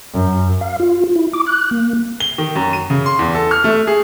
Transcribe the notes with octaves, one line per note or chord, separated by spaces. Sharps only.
F#2
F5
F4
E4
D6
F#6
A#3
G7
D#3
F#2
D#7
C#3
C6
E2
A4
F6
A3
G#4